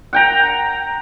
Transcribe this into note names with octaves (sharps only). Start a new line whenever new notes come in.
F#5 G5 A#5